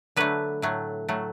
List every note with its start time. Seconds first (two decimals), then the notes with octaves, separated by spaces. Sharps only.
0.16 D3 F#3 A3 B4
0.62 A2 F#3 A3
1.09 A2 F#3 A3